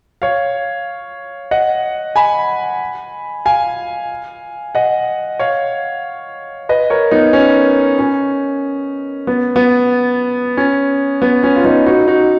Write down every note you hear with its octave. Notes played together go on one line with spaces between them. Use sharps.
C#5 F5
D#5 F#5
G#5 B5
F5 G#5
D#5 F#5
C#5 F5
B4 D#5
A#4 C#5
B3 D#4
C#4
C#4
B3
B3
C#4
B3
C#4
F4
B3 D#4
D#4 F#4
D#4 F#4